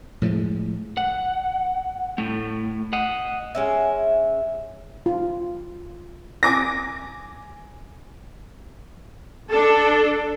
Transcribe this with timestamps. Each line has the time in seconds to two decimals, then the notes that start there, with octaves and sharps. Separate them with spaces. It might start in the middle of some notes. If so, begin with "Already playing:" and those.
0.22 A2 F3 F#3 G#3
0.97 F#5
2.18 A2 A3
2.93 D#5 F#5
3.55 G#3 C#4 E5
5.06 F4
6.43 G#5 D6 A#6
9.50 D4 A4